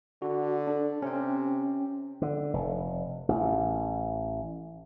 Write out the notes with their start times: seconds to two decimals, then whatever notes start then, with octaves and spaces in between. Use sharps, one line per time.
0.22 D3 F#4
0.67 D4 A4
1.02 C3 C#4 G5
2.22 D3
2.53 F1
3.29 A1